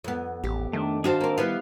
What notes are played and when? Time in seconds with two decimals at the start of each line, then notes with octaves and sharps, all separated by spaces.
0.04 F2 B3
0.44 A1 G4
0.73 D#3 A3 D4
1.04 D4 F#4 G#4 C5 F5 A5
1.21 A#3 C4
1.38 G3 B3 E4 B4 F5